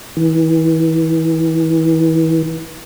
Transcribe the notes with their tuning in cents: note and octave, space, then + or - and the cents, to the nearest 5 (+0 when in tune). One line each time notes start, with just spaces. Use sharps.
E3 -30